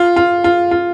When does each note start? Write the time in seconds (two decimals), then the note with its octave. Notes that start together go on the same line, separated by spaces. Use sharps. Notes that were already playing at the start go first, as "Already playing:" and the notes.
Already playing: F4
0.16 F4
0.44 F4
0.71 F4